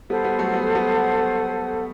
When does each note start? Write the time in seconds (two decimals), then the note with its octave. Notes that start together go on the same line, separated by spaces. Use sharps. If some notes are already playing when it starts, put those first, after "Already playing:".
0.10 G3 B3 A4 C5 F#5
0.24 G3 B3
0.39 F#3 A3
0.53 G3 B3
0.75 G3 B3